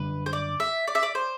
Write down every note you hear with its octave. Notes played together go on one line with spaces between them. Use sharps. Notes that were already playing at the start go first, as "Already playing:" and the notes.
Already playing: F#2 D3 G3 D4 B4
C5
D5
E5
D5
E5
D5
C5